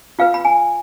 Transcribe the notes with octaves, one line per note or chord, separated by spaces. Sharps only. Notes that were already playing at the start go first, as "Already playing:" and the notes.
F4 B4 F5
B5
G#5